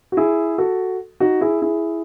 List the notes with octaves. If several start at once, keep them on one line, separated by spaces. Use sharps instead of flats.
F#4
E4 G#4
F#4 A4
D#4 F#4
E4 G#4
E4 G#4